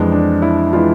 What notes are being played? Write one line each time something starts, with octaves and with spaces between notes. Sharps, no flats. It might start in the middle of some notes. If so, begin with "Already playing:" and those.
Already playing: F2 E3 G#3 D4
D4
E4
E3 G#3 F4